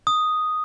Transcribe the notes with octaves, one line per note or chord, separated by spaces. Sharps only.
D#6